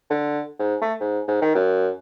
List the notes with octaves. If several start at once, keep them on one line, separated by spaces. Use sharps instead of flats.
D3
G#2
A3
G#2
G#2
D#3
F#2